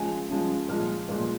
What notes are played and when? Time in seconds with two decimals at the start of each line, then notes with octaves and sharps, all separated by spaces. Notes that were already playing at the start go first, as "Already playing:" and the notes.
Already playing: C#3 F3 G#3 G#5
0.30 C#3 F3 G#3
0.69 A#2 F3 G#3 F6
1.09 A#2 F3 G#3